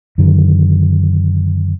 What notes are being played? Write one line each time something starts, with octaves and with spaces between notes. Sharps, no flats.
F#2 D3 D#3